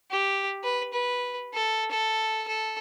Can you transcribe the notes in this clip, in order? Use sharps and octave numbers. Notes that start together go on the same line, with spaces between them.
G4
B4
B4
A4
A4
A4